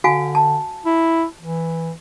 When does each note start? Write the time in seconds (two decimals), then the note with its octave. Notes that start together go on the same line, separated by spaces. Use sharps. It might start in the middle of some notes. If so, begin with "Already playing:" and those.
0.04 D3 F#4 F5 G#5
0.35 A5
0.86 E4
1.40 E3